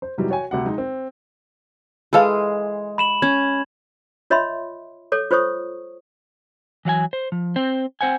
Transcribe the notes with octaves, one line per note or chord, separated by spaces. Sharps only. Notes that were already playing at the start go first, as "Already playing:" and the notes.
C5
G#2 C3 E3 F#3 G3
F#4 C#5 G5 G#5
D2 C3 F#5
G#3 D#4
C4
E3 G#3 G#4 A4 F5
B5 E7 F#7
C#4 G#6
F4 C#5 D#5 E5 B5 C6
A4 C#5 D6
F4 C5 C#5 C#6 D#6
E3 F#3 F#5 G#5
C5
F3
C4 C5
C4 C5 F#5 G#5